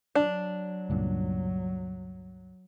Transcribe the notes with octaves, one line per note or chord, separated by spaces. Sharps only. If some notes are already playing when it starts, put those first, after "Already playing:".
F#3 D4
C#2 G2 A#2